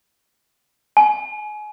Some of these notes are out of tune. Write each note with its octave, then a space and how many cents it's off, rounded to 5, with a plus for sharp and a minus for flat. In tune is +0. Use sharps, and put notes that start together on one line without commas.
G#5 +30